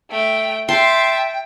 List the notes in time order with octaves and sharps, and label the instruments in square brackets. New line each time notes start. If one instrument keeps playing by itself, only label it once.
[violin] A3 G5
[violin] E5 A5 [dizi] G5 [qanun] C6